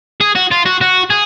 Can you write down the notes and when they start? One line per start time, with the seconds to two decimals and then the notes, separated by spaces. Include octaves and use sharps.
0.21 G#4
0.35 F#4
0.51 F4
0.66 F#4
0.81 F#4
1.10 G#4